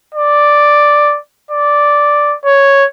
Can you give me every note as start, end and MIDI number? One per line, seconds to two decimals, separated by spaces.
0.15 1.19 74
1.51 2.36 74
2.45 2.86 73